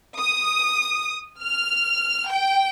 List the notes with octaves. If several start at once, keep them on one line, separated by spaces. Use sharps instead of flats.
D#6
F6
G5